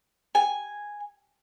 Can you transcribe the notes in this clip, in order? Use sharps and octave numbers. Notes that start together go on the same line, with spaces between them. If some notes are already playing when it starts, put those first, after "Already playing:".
G#5